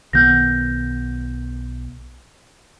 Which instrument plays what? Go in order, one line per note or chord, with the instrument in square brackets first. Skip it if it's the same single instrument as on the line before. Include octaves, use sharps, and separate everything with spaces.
[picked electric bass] B1 D#3 B3 [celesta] F6 G6 A#6